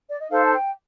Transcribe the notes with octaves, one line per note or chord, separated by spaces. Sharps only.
D5
D#5
D#4 A4 C5 F5
A5
G5